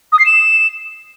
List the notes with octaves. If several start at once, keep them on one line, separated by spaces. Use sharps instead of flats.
D#6
C7
E7